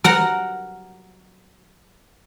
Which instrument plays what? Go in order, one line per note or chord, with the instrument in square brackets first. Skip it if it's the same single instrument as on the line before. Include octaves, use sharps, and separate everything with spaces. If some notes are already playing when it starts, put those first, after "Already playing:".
[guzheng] A#4 F#5 A#5